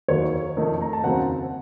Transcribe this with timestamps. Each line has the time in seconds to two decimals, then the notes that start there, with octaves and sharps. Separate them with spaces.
0.08 D#2 D#3 F#3 C#5
0.57 F1 F2 D#3 A3 D#4
0.81 A#5
0.93 A5
1.04 D#2 C#3 F#3 C4 F#5